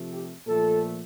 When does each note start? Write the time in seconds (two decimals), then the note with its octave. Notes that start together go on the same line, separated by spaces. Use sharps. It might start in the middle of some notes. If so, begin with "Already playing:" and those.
Already playing: C3 F3 A3
0.12 G4
0.47 A#2 F3 A3 A4